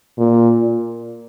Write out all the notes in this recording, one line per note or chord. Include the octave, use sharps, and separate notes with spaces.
A#2